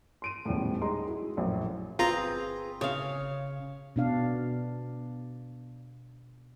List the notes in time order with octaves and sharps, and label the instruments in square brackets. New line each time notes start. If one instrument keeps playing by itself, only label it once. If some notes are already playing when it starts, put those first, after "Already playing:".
[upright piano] C6 D7 D#7
D#1 E2 A2
G#3 D#4 A#5 C6
G#3 E4 F#4
A#1 F#2 A2
[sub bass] G1 [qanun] C4 [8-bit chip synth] F4 A#5 [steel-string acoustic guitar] G#4 B4
[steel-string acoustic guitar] C#3 [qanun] C#5 F5
[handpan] B2 D4 F5